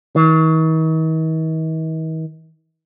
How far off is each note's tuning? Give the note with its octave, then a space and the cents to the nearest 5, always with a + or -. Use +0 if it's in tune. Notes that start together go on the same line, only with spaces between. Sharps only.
D#3 +45